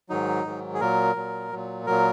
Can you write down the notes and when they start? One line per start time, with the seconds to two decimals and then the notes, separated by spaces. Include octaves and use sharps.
0.09 G#2 D#3 F#3 D#4
0.45 G#2 D#3 F#3
0.74 G#4
0.80 A#2 F#3 A#4
1.16 A#2 F#3
1.52 A#2 F#3
1.86 A#2 F#3 A#4